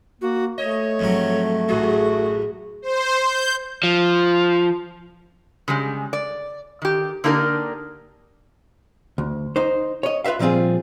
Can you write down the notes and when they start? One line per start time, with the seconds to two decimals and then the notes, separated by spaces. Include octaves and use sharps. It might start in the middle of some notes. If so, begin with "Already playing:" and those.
0.21 A#3 F#4
0.58 A3 C#5 D#5
0.99 F2 G#2 F#3
1.69 A1 F#2 F#4 G#4
2.82 C5
3.17 G6
3.83 F3
5.68 C#3 G3 G#3
6.13 D5
6.82 D#3 G4
7.24 D3 A#3 D4 D#4 G4 A#4
9.18 D2
9.56 D#4 C5
10.03 C#5 D#5
10.24 F4 B4 C5 E5 F5
10.39 A#2 F3 G3 C4 F4 G#4